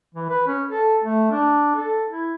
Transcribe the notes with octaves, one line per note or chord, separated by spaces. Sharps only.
E3
B4
C#4
A4
A3
D4
A4
E4